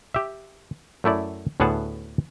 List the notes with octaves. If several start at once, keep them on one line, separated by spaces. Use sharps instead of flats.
G4 E5
F#2 A3 E4 D5
D2 A2 B3 G#4 F#5 A5